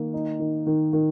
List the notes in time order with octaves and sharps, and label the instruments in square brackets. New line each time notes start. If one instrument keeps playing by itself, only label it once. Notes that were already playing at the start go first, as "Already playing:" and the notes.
Already playing: [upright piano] D#3 A#3
D#4
D#3
D#3
D#3